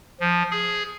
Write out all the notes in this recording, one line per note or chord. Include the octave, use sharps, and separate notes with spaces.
F3
G#4